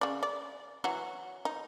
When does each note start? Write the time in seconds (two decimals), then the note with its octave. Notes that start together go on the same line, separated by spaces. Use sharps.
0.01 C#3 D5
0.23 D5
0.84 E3 F#3 F#4
1.45 D#4